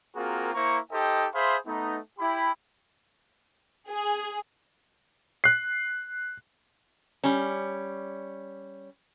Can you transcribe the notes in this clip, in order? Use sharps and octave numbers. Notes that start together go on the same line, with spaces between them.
A#3 C4 F4 F#4 G#4 A#4
A#3 E4 C5 A#5 C#6
D#4 G4 A4 C5 D#5 G5
G#4 C5 E5 F5 B5 C6
A3 B3 D#4
E4 G4 B5
G#4
F#6 C7
G3 C#4